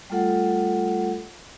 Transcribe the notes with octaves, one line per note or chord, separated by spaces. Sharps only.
G3 A3 F4 A4 F#5